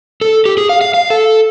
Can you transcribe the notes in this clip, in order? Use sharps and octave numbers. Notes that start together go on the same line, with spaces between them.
A4
G4
G#4
F5
F5
F5
A4